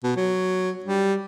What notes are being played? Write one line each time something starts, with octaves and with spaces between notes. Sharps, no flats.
B2
F#3
G3